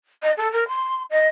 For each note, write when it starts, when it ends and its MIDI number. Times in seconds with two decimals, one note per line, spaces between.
0.22 0.31 75
0.37 0.51 69
0.52 0.68 70
0.68 1.03 84
1.10 1.28 75